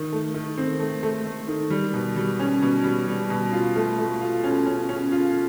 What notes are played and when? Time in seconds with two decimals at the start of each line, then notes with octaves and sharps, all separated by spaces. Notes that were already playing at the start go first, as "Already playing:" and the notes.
Already playing: D#3
0.12 A3
0.34 D#3
0.58 C4
0.80 A3
1.03 A3
1.25 A3
1.48 D#3
1.70 G3
1.94 B2
2.16 G3
2.39 C#4
2.62 B2
2.84 G3
3.07 G3
3.30 B2
3.52 F4
3.76 A3
3.98 A3
4.21 F4
4.44 C#4
4.66 C#4
4.89 C#4
5.12 F4